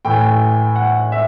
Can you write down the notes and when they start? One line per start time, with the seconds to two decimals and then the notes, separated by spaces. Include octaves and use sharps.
0.05 A2 E3 G5
0.76 F#5
1.12 E5